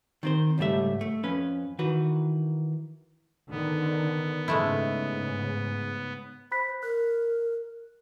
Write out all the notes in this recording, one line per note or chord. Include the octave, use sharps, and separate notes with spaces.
D#3 C4 C5
C#2 G#2 G3 A3 E5
A3
F2 C#4 B4
D#3 E3 F#4 B4
D3 D#3 B3
G#2 C#3 G#3 A3 E4
C5 B5 F#6 B6
A#4 F#6